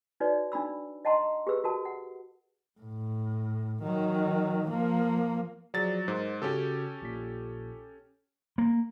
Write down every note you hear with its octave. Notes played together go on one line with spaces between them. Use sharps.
D#4 F#4 B4 C#5 D5
D4 D#4 B5 E6
D#5 F#5 A5 A#5 C6
G4 G#4 B4 E6
F#4 A#4 A5
F#5
A2
D#3 F#3
F3 A#3
F3 F#3 G#4 D5 A6
G#2 A#4 C5
C#3 C#4 F#4 G4 A4
A#1 A#2 B6
A#3